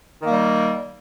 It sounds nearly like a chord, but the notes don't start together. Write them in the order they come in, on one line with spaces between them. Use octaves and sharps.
D#3 A#3 G3